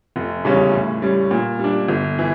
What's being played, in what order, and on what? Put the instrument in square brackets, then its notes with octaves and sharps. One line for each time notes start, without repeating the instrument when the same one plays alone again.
[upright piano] F1
E2 C#3 G3 C#4
A2
G3 C#4
A#2
G3 D4
G1
E3